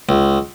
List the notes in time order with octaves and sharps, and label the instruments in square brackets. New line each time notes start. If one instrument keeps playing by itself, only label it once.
[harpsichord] C#2